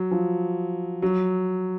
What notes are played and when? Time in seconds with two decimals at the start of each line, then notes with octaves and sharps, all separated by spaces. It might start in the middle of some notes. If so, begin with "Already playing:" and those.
Already playing: F#3
0.11 F3
1.02 F#3